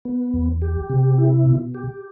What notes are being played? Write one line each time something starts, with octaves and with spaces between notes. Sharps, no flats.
B3
E2
G4
C3
E4
B2
G4